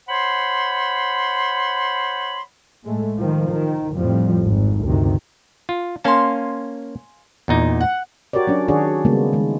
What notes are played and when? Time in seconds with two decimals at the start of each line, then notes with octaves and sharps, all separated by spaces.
0.08 C5 C#5 F#5 B5 C6
2.84 A2 G#3 A3
3.17 D#3 F3
3.50 D#3
3.96 F2 A2 F3 G3
4.45 G#1
4.85 D2 G2 C3 D#3
5.69 F4
6.04 A#3 C#4 F5 G#5 A5 C6
7.48 E2 A#2 D#4
7.81 F#5
8.33 F#4 G4 A#4 C#5 D5
8.47 F#3 C#4 D4
8.68 D#3 D4 F#4 G#4 C#5 D5
9.05 C#3 G3 G#3 A#3 B3
9.33 D#3 G#3